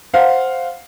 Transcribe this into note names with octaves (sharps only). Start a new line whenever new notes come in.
C5 F5 F#5